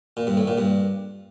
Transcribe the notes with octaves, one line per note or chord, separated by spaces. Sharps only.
A#2
G2
A2
A#2
G2